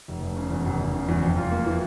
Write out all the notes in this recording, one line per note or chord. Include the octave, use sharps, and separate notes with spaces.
F1
F1
C#3
E2
F1
F1
C#3
E2
F2
F4
A#3
E3